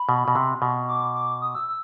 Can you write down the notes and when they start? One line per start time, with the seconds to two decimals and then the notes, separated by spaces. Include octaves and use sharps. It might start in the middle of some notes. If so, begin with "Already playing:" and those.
Already playing: B5
0.09 B2
0.28 B2
0.35 C3
0.62 B2
0.88 D6
1.14 D6
1.42 D#6
1.55 E6
1.68 E6